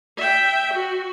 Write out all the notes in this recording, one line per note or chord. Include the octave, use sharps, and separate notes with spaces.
E5 G5
F#4